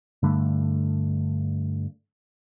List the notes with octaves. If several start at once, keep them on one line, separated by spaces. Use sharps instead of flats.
G2 D3 A3